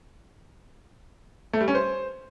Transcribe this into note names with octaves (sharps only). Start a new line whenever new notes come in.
A3
G3
C#4
C5